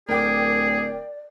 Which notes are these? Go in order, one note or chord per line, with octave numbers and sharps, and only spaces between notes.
D1 G#4 A#4 D5 G5 D6